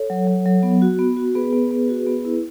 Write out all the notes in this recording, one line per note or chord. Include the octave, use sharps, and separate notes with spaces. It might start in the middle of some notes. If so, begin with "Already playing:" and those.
Already playing: A4 C#5
F#3
F#3
F#3
B3
F#4
B3
F#4
B3 G#4 B4
B3
B3
F#4
B3
E4